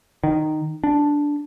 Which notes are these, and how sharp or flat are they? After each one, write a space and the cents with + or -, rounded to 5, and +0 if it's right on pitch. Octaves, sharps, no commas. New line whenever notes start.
D#3 -10
D4 -5